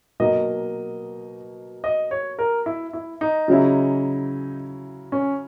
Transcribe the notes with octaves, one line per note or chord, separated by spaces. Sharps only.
B2 F#3 A#3 D#4 D#5
D#5
C#5
A#4
E4
E4
D#4
C#3 F#3 C#4 E4
C#4